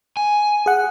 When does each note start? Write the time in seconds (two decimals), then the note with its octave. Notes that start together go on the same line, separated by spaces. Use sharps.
0.17 G#5
0.66 G#4 F#5